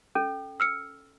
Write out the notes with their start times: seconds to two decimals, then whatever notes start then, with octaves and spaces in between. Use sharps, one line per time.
0.15 C#4 A4
0.60 E6 F6 C#7